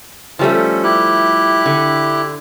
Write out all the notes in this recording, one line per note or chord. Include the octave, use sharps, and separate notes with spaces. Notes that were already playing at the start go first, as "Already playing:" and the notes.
F3 G3 A3 C#4 A4
E4 G4 F#6
D3